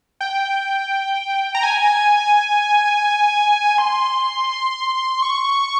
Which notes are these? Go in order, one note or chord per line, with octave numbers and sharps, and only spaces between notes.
G5
A#5
G#5
C6
C#6